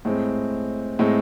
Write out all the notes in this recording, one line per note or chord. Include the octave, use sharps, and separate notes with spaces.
A2 G#3 C4
A2 G#3 C4